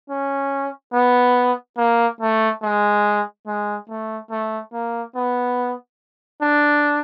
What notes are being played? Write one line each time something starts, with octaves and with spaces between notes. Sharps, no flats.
C#4
B3
A#3
A3
G#3
G#3
A3
A3
A#3
B3
D4